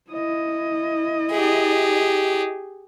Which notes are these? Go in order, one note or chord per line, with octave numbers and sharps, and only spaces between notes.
E4 D#5
G4 G#4